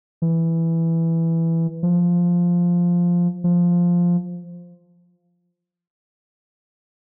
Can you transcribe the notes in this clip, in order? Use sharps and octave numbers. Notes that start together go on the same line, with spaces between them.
E3
F3
F3